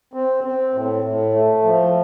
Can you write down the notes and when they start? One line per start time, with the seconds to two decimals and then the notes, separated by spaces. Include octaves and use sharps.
0.14 C4
0.44 C4
0.74 A2
1.04 A2
1.33 A3
1.63 F3